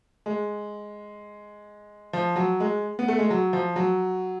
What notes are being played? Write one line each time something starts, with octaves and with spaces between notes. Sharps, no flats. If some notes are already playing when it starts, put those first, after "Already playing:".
G#3
F3
F#3
G#3
B3
A3
G#3
F#3
F3
F#3